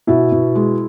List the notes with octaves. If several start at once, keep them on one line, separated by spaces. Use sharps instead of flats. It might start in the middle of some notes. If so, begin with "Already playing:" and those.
B2 E4
B2
G#3